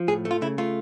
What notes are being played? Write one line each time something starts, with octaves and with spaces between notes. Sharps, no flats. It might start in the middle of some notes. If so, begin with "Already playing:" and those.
Already playing: F3
A2 G#4
A3
F4
C#3 E4
A3 F4